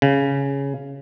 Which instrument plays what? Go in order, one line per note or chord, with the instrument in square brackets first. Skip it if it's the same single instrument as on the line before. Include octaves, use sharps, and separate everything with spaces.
[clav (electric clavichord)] C#3